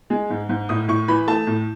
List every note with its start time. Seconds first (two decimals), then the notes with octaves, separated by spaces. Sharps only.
0.10 G#3
0.30 G#2
0.49 G#2
0.69 A2 D#6
0.88 A2 C#6
1.08 E3 B5
1.27 A3 A5
1.47 A2